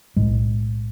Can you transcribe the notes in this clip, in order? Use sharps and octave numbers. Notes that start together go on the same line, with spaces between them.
B1 A2 G#3